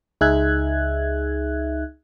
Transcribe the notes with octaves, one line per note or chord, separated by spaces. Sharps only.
C#2 D#4 G#4 E5 F#6 G#6